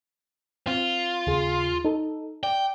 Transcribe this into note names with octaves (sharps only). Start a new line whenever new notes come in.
C4 F4
D#2 C#3 G#4
D#4 A4
D5 G5